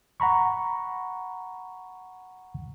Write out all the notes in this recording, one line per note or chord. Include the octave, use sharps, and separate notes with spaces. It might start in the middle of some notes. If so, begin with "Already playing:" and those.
F#5 A#5 B5 C#6